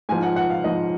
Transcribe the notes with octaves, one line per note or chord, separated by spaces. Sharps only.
G#2 F3 G#5
F#5
F#5
F5
G#2 F3 D#5